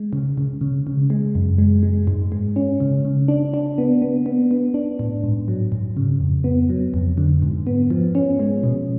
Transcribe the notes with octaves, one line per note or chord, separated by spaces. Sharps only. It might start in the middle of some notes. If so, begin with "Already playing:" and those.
Already playing: G#3
C#3
C#3
C#3
C#3
G#3
F#2
G#3
G#3
G#2
G#3
C#4
C#3
C#3
D4
D4
B3
B3
B3
B3
D4
A2
G#2
F#3
G#2
C#3
F2
B3
F#3
F2
D3
G#2
B3
F3
C#4
G#3
B2